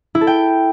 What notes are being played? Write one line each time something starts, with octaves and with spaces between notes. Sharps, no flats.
E4
A4
G5